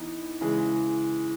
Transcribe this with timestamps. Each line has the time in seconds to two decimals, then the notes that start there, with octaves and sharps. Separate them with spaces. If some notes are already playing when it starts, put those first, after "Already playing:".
Already playing: E3 B3 D#4
0.41 C#3 E3 G#3